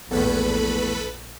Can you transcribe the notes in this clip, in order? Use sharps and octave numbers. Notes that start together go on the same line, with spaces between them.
A#1 E2 A2 A4 B4 B5